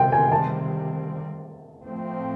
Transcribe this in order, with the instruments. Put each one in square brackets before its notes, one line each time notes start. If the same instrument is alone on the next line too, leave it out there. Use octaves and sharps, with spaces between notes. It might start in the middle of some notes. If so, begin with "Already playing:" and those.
Already playing: [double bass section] C3 D#3 G3 C4 [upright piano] G5
[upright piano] G#5
A5
[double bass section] A2 F3 A3 C4